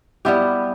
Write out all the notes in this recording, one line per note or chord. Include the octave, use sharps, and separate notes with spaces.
G3 B3 E4 G4